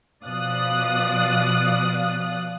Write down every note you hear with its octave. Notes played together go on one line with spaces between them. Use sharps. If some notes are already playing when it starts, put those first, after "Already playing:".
B2 F3 D5 F5 D#6 F#6